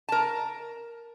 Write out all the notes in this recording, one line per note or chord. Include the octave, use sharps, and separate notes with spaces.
A#4 A5